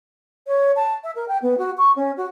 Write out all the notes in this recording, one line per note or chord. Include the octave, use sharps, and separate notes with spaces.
C#5
A5
E5
A#4
G5
B3
F#4
C#6
C#4
F#4